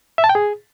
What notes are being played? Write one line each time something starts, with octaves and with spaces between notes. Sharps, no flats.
E5
A5
G5
G#4